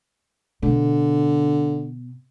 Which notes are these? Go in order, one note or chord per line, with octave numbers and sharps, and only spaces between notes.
B2 D3 B3